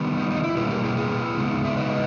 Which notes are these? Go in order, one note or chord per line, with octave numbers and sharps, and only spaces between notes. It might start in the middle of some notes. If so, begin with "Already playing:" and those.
Already playing: D#3 G3 B3
D#4
D#4
E4
B2 G3 A#3 C#4 G#4 B4
G4 A#4
E4 G#4
G#4 B4
C#3 G#3 B3 D#4
E5
B4 D#5